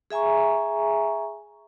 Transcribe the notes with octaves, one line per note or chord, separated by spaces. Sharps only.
G#4 E5 G#5 A#5 C#6